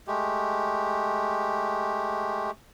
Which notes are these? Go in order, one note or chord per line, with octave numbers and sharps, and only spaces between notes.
G#3 A3 G4